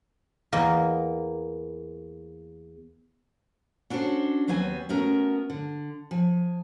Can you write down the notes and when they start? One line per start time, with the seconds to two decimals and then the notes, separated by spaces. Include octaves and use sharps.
0.52 E2 A#3 A#4 D#5
3.90 C#4 D4 F#4 A4 C5
4.48 D#2 F#3 B3 C4 D5 G#5
4.89 A3 B3 C#4 F#4 A#4
5.50 D3
6.11 F3 G#5